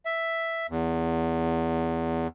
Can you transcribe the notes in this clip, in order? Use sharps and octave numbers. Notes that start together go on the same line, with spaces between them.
E5
E2